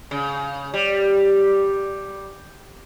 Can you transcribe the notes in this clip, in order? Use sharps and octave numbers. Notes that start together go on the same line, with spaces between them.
C#3
G3